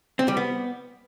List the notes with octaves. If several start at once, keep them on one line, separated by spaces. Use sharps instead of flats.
C4
G3
B3